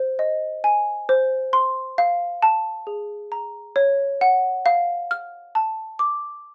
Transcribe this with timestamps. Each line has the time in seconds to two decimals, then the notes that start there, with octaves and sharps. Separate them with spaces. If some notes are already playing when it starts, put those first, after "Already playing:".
Already playing: C5
0.19 D#5
0.64 G#5
1.09 C5
1.53 C6
1.98 F5
2.42 A5
2.87 G#4
3.32 A#5
3.76 C#5
4.21 F#5
4.66 F5
5.11 F6
5.55 A5
5.99 D6